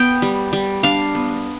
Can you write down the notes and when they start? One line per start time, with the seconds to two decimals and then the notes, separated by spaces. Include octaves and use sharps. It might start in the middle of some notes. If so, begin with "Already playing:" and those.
Already playing: B3 G5
0.22 G3
0.53 G3
0.83 D4 F5
1.15 B3